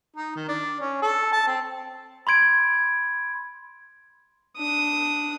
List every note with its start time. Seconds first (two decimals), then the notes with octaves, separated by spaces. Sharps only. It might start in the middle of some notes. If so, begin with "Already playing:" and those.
0.16 D#4
0.36 D#3
0.48 D4
0.81 C#4
1.02 A4
1.33 A5
1.47 C4
2.27 B5 C6 G#6 D7
4.57 D4 D#6